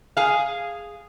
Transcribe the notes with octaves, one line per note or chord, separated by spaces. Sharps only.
G#4 F5